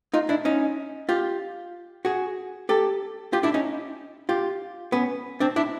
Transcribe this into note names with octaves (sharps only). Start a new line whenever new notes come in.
D#4 F4
D4 E4
C#4 D#4
F4 G4
F#4 G#4
G4 A4
F4 G4
D4 E4
C#4 D#4
F4 G4
B3 C#4
C4 D4
D4 E4